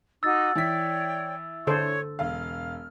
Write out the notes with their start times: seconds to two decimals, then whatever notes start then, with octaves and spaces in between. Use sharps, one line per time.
0.23 D#4 F#4 D6 E6 A6
0.55 E3 C#5 D5 G5 B6
1.67 D3 A4 C5 C#5 C#6
2.19 E1 F5 F6